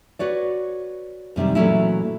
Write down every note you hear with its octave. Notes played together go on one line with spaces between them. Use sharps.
F#4 B4 C#5 D5
F#2 C3 D#3 G3
A#2 E3 F#3 A3 C#4 E4